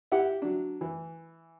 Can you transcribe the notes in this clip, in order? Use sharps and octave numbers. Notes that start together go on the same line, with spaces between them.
E4 G4 F#5
F#3 D4
E3